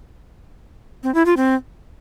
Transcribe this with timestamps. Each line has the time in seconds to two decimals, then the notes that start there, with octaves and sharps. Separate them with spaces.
1.03 C4
1.14 E4
1.26 F4
1.37 C4